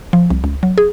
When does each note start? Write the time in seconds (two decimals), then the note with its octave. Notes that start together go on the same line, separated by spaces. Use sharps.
0.13 F3
0.30 C2
0.44 C#2
0.63 F#3
0.78 G#4